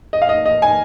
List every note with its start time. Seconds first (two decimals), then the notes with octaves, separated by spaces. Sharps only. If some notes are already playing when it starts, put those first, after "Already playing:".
0.13 D#5
0.22 F5
0.29 D#5
0.46 D#5
0.62 G#5